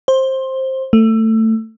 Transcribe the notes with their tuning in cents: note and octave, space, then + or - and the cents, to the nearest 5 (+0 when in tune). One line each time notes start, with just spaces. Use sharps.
C5 +15
A3 +20